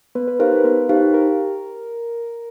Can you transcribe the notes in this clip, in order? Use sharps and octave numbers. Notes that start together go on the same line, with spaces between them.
B3 B4
B4
D#4 G4 A#4 C5 F5
B4
B3 A#4
D#4 G4 C5 F5
G4 A#4